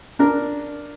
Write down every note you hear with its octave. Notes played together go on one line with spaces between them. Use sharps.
D4 A#4